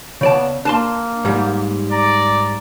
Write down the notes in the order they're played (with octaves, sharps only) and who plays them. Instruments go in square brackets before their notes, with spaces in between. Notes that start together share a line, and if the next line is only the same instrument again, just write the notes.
[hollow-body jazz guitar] C#3 D5 A5 [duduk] B3
[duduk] A#3 [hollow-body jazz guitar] D4 A5 C6
[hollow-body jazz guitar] G#2 G3
[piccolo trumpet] D5 [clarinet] A#5